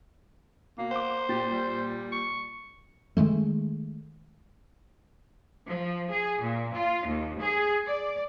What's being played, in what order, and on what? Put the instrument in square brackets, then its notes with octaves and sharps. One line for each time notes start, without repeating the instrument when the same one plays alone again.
[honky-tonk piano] B2 [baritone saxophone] A#3
[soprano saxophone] C5 [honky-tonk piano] F#5 D6
[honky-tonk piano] A#2 A6 [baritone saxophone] G4
[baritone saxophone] G3
[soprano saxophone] C#6
[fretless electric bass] D#3 E3 G#3 A3
[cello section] F3
G#4
A#2
F4
D#2
G#4
D5